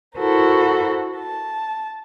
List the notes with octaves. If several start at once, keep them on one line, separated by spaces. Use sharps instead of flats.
E4 F#4 A4 A#4 C5
A5